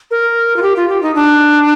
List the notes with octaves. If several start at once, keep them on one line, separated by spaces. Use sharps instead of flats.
A#4
F4
G4
F4
G4
D#4
D4